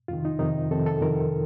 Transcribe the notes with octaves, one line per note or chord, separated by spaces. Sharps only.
F2 C3 D#3 F4
D#4
F2 C3 D#3 D#4
F2 C3 D#3 A4
A4
F2 C3 D#3 A#4